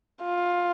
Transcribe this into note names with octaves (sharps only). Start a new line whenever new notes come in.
F4